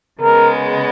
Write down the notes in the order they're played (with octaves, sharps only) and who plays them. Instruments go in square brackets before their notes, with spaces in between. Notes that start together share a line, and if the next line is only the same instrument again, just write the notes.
[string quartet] C#3 G#3 B3 [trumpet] A#4